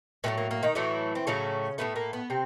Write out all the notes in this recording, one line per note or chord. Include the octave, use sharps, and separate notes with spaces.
A2 F#3 A3 B3
A#3
A#3
D#3 D#4
A2 E3 F#3 A3 E4
C4
A2 C#3 F#3 A3 C#4
A2 F#3 A3 B3
A#3
B3
C3 C4